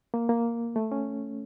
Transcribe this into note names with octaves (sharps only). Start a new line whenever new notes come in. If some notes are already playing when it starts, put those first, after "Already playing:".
A#3
A#3
A3
C#4